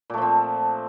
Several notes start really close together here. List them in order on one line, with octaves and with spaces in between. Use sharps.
A#2 A3 F3 C4